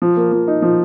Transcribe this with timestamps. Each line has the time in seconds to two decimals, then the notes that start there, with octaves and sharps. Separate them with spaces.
0.02 F3
0.16 A#3
0.32 F3
0.48 D#4
0.62 F3